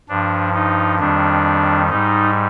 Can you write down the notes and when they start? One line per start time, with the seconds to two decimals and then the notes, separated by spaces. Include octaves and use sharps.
0.09 G2 F3 D4
0.54 D#4
0.99 F2 D#3 G3 D4
1.89 G#2 G3 D#4